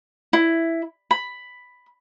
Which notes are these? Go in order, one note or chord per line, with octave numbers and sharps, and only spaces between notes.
E4
B5